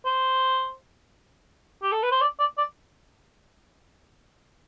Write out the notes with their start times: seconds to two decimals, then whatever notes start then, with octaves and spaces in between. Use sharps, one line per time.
0.05 C5
1.82 G4
1.92 A4
2.03 B4
2.11 C5
2.21 D5
2.39 D5
2.58 D5